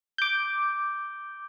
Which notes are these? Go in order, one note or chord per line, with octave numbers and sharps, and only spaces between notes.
D6 G6